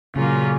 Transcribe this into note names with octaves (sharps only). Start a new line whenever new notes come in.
A#2 C#3 F#3 A#3 C#4 F4